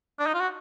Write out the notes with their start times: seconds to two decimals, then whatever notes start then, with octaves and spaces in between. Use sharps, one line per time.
0.19 D4
0.26 D#4
0.34 F4
0.40 F#4